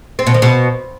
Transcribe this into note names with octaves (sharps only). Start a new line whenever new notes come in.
C4
B2
D#3
B2